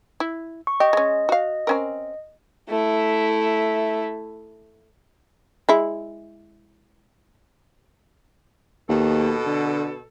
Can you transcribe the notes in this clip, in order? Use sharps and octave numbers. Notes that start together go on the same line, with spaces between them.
E4
C#6
G4 D#5
G#3 C#4
F#4 F5
C4 C#4 A#4
A3 E4
G#3 E4
D#2 B2 A4
D3